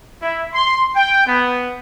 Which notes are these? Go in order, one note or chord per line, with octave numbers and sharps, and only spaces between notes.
E4
C6
G5
B3